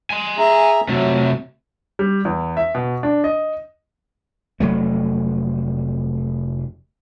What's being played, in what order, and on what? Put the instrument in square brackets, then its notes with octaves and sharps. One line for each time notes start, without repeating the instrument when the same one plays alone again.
[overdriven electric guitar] G#5 C6
[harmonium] G#4 E5 A#5
[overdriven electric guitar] C3 A3 [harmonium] F#3
[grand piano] G3
E2
E5
B2
D4
D#5
[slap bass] F1 F#3 A3